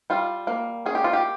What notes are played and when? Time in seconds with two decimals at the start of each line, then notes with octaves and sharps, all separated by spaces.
0.10 G3 F4
0.47 A#3
0.86 C#4 G#4
0.95 G4
1.04 F4
1.13 G4